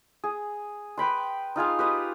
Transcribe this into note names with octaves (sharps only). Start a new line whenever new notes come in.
G#4
B4 G5 B5 C6
D#4 F4 G#4 F5
G4 B4 D#5